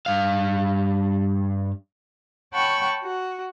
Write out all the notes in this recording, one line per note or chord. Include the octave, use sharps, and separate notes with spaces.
G2 F5
C#5 F#5 G5 A5 B5 C#6
F#4